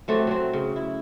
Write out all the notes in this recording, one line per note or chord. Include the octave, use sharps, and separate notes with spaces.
F#3 A3 C4 G4
F#3 C4
C#3
E4